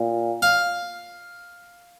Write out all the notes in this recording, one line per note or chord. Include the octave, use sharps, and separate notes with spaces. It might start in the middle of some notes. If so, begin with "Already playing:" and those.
Already playing: A#2
F5